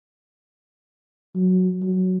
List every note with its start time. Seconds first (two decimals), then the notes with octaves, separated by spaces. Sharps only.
1.35 F#3
1.82 F#3